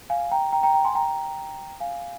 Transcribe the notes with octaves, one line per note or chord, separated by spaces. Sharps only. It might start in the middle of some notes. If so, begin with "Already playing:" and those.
F5 G#5
G5 A#5
G5 A#5
G5 A#5
G5 A#5
G#5 C6
G5 A#5
F5 G#5